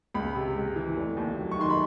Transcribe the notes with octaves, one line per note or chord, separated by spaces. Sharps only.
C#2 B5
C3
G#3
E3
F1
D#2
F#3
C#6
D#3 C6
B5